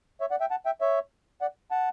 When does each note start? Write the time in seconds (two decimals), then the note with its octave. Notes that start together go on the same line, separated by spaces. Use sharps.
0.21 C#5 E5
0.31 D5 F#5
0.40 E5 G5
0.51 F#5 A5
0.66 E5 G5
0.81 C#5 E5
1.41 D5 F#5
1.71 F#5 A5